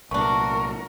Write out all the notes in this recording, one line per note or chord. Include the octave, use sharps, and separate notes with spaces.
C2 A#2 E3 D4 F#4 A#4 C#6